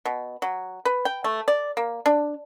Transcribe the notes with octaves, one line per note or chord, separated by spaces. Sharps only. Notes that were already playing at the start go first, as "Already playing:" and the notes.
B2
F#3
B4
G5
A3
D5
A#3
D4